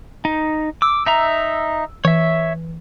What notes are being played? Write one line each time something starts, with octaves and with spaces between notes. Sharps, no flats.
D#4
D6 E6
D#4 E5 A#5
E3 C#5 E5